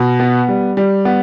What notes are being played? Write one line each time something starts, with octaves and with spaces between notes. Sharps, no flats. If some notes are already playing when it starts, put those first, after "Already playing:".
Already playing: B2
B3
G3
G3
B3